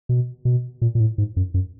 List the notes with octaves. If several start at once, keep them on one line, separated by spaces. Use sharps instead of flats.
B2
B2
A#2
A#2
A2
G#2
F#2
F#2